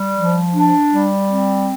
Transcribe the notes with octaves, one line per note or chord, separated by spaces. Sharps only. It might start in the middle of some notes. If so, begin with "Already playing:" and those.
Already playing: G3
F3
D4
G3
C4